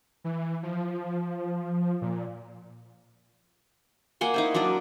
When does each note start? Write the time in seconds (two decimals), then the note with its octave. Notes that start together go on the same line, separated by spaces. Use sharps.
0.24 E3
0.63 F3
2.02 A#2
4.21 A#3 F#5 G#5 C6
4.34 D#4 E4 C5
4.54 F#3 D4 D5 D#5